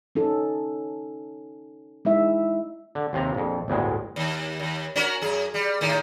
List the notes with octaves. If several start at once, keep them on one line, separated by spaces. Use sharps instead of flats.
C#4 D#4 A4
G#3 D#4 E4 E5
D3
D#2 C3 A#5
A#1 F2
G1 D2 A2 G#3
D#2
D#2
C#4 F#4 A#4
F#2 G#4
G3
A2 D#3